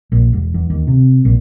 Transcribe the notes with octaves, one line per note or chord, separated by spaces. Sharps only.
A#1
E1
E2
D#2
C3
A#1